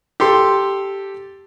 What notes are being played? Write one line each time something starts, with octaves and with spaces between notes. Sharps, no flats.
G4 A4 C6